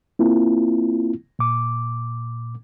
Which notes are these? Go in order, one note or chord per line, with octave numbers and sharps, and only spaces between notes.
A#3 C4 E4 F4
A#2 D6